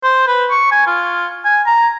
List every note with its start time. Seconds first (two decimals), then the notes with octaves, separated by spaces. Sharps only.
0.04 C5
0.27 B4
0.51 C#6
0.72 G#5
0.87 F4
1.45 G#5
1.66 A#5